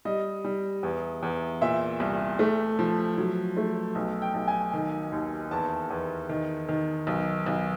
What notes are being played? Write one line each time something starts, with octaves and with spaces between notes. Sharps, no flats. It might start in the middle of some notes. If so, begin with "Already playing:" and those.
G3 D#5
G3
E2
E2
A#2 E5
C2
A3
F3
F#3
A3
B1
G5
B1
G#5
D#3
D#2
E2 A5
E2
D#3
D#3
B1
B1